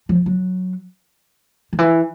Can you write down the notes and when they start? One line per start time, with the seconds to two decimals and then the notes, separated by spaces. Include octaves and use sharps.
0.09 F3
0.26 F#3
1.73 D#3
1.79 E3